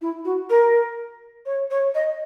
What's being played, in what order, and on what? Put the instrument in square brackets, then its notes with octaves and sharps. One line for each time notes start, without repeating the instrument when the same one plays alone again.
[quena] E4
F#4
A#4
C#5
C#5
D#5